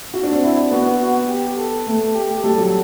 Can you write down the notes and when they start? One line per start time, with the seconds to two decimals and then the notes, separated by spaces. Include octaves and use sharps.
0.14 F#4
0.23 D4
0.32 C4
0.43 E4
0.71 B3 F#4
0.99 F#4
1.28 G4
1.58 A4
1.87 A3
2.14 G4
2.43 G3 A4
2.58 F#3